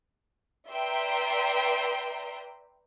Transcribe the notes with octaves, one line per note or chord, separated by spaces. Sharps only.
B4 D5 E5 G5 A#5 C6